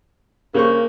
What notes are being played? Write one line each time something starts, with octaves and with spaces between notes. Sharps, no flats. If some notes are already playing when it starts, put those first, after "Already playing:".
C#3 A#3 C5 C#6